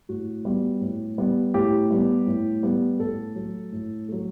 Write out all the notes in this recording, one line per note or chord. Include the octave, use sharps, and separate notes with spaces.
A2 F#4
G3 B3
A2
G3 B3
A2 G4
G3 B3
A2
G3 B3
A2 A4
F#3 A3
A2
F#3 A3